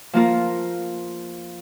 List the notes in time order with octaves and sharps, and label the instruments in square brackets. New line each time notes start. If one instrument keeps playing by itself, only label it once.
[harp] F3 A#3 F4 A#4